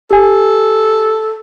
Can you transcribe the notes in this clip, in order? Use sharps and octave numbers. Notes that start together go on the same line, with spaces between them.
G4 A4 G#5